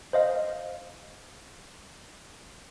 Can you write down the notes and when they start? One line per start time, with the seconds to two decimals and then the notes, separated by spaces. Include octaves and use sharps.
0.13 C5 D#5 F5